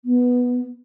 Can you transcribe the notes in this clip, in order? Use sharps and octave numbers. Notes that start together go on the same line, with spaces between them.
B3